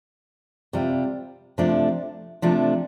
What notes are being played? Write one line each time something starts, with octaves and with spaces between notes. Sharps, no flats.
C3 G3 F4
C3 F3 A3 D4
C3 F3 A3 D4